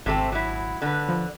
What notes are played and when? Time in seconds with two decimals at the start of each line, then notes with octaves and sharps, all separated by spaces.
0.06 G#1 C3 A3 C4
0.32 F#3 E4
0.82 D3 B4
1.08 F3